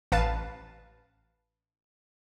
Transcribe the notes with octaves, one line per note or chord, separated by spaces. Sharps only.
A1 B4 F5 A5 A6